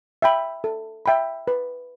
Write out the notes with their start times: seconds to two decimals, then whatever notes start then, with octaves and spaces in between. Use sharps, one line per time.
0.22 E5 G5 B5
0.64 A4
1.06 E5 G5 B5
1.48 B4